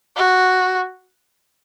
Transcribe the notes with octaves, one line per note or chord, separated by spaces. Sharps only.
F#4